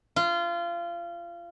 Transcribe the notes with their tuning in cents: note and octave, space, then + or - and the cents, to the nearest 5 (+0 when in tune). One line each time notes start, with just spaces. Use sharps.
F4 -25